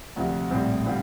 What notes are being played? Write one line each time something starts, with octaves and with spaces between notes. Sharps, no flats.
D2 C3 F3
A#1 A2 G3 C4
D3 G3 C4 F4